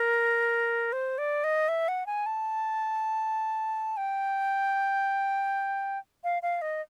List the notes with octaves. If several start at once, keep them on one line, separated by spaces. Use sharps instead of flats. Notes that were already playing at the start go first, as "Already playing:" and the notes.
Already playing: A#4
C5
D5
D#5
E5
F#5
G#5
A5
G5
F5
F5
D#5